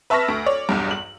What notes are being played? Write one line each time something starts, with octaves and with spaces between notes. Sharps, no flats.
B4 E5 A5 C#6 F6 A#6
D2
C#5 D5
B1 E2 G2
F#7